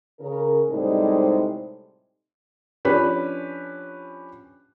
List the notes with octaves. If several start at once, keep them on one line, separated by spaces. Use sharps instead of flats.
C#3 A#4
A2 C3 G3 G#3 D#4 C5
F3 C#4 D4 G4 B4